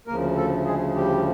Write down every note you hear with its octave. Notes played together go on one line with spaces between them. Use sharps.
D2 C#3 F3 A#3 A#4
A3 A4
G#3 G#4
G3 G4